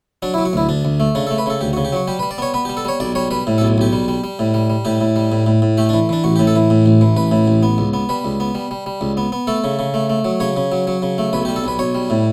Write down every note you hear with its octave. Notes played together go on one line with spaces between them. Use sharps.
F#3 D4
E4
F#3
F#4
D2 E4
D2 D4
D2
A3
C#3 D4
A4
A3
B4
C#3 A4
D2 G4
F#4
C#3
G4
F#3 F#4
G3 G4
B4
G3
D5
B3 C#5
B3 B4
G4
G3
A4
G3 C#5
B1 D5
G3 C#5
G3 B4
A2
A4
B1
B1 G4
G3
G3
G3
A2
G3
G3
A2 G4
A2
G3
A2
A2
A2
A3 G4
D4
E3
E3 D4
A1 F#4
G4
A2
A4
E3
A2
A1
E3
A1 B4
A2
A1
B3
C#2
B3
G3 B4
C#2
B3
G3
G3
G3
C#2
B3
B3
A3 A4
C#3
C#3
A3
A3
F#3
C#3 C#5
C#3
F#3
F#3
C#3
A3
B1 B4
G4
G3
A4
B1 B4
B1 C#5
G3
A2